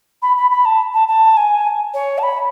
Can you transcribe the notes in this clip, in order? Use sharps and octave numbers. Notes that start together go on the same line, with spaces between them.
B5
B5
B5
A5
A5
A5
G#5
C#5
A5
B5